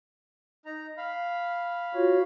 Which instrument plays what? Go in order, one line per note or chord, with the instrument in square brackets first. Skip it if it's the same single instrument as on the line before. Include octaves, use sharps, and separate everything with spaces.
[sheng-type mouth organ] D#4 A#5
F5 B5
[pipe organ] F4 F#4 C#5